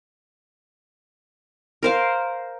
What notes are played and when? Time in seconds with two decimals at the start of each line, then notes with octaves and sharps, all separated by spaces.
1.83 A#4 C5 F5